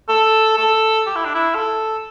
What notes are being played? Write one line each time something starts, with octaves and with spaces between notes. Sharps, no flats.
A4
A4
G4
E4
D4
E4
A4